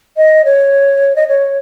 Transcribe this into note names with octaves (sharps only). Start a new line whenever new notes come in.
D#5
C#5
D#5
C#5